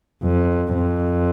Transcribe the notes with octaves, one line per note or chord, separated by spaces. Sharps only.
F2
F2